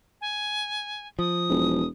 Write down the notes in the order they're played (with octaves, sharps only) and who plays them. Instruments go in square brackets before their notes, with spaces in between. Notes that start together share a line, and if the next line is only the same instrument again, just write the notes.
[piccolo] G#5
[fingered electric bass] F3 [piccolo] D#6
[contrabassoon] E1